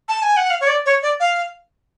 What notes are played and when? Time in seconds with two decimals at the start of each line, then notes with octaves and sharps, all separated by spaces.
0.09 A5
0.22 G#5
0.37 F#5
0.50 F5
0.61 C#5
0.67 D5
0.86 C#5
1.03 D5
1.20 F5